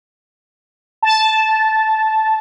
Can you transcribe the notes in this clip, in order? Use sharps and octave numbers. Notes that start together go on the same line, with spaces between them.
A5